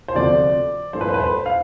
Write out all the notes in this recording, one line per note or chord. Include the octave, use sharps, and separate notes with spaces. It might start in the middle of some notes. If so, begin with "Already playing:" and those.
C5
D2 C3 F3 A3 D5
G2 F3 A3 C5
B4
C5
B4
C5
F5